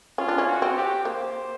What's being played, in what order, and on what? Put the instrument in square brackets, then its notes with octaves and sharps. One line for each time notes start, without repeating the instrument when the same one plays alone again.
[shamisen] C#4 [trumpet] F4
[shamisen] D4
C#4
[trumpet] F#4
[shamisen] C4
[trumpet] G4
[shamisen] A#3 [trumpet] C5